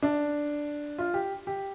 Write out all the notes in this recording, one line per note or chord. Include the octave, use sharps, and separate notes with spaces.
D4
F4
G4
G4